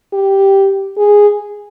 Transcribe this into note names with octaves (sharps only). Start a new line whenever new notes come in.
G4
G#4